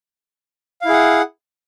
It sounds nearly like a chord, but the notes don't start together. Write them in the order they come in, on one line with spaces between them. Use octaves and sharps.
F5 E4 G#4 F#5